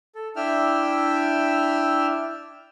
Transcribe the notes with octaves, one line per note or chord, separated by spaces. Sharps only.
A4
D4 E4 E5 G5 E6 F6